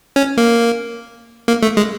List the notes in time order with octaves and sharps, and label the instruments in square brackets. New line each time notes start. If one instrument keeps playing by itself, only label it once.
[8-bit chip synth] C#4
A#3
A#3
A3
G#3